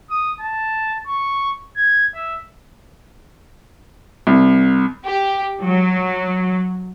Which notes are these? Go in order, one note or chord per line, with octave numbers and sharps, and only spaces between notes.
D#6
A5
C#6
G#6
E5
C2
G4
F#3